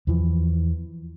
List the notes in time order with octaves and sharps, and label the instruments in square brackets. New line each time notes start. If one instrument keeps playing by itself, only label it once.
[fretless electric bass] E2 E3 F3